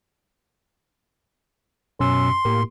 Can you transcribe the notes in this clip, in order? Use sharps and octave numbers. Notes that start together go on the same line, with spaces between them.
F#2 B2 C#4 C6 E6
A2 A#3 G4 A#4